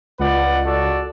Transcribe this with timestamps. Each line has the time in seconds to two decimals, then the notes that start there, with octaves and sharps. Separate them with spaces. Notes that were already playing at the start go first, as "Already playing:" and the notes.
0.19 C#2 B4 D5 F#5
0.64 F#4 A4 D5